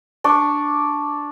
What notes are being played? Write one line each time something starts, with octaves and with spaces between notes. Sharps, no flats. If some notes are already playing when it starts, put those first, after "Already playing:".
D4 C#6